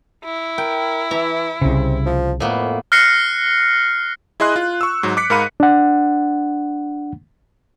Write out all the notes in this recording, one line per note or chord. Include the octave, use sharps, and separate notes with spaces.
E4
A#4 G5
E3 E5 A#5
C2 C#3 C4
F3
F2 A2 A#3 B3
F6 F#6 A#6 C7 C#7
E4 G#4 D#5 C6 F#6
F4
C#6 E6
G#2 F#3
D6 F#6 B6 C#7
G#2 A#4 F5 B5 F#6 D#7
D4 F#5